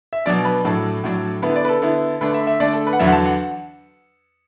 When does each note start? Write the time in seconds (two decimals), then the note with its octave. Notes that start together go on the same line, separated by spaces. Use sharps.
0.13 E5
0.26 B2 F#3 D4 D5
0.45 B4
0.65 A2 F#3 D4 A4
1.04 A2 F#3 D4
1.42 D3 B3 E4 B4
1.56 D5
1.65 B4
1.69 A4
1.82 D3 B3 E4
2.21 D3 A3 D4 B4
2.34 E5
2.47 E5
2.60 D3 A3 D4 D5
2.73 A4
2.87 B4
2.93 F#5
2.99 E2 D3 F#3 D4 E5
3.07 F#5
3.12 A5
3.26 F#5